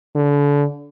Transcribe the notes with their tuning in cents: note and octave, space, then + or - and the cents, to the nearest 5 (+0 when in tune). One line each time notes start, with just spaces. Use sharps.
D3 -30